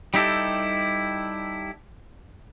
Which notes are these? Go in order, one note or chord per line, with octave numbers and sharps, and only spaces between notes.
G3 D#4 E4 G4 A4